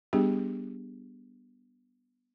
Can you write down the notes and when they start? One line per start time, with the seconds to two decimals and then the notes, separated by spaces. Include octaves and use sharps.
0.13 G3 B3 D4 G4 G#4